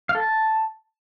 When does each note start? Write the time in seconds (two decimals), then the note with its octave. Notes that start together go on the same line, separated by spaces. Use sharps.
0.09 F5
0.15 A4
0.20 A5